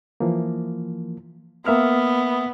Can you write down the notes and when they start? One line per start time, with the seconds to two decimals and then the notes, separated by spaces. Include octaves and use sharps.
0.20 E3 F3 A#3
1.66 A#3 B3 E5 F6